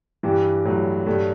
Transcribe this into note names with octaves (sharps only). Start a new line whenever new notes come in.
G2 E3 G3
A2 F#3
G2 G3 A3